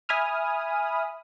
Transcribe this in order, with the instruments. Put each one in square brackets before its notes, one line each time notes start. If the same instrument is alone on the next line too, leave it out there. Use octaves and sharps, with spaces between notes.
[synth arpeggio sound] E5 G#5 B5 D#6 F6